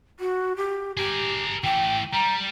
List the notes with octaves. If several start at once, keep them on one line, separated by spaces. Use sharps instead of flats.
F#4
G4
G4 G#4 A#4
E3 A3 G5
G3 A#5